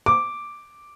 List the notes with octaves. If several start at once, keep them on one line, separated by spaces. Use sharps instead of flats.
D6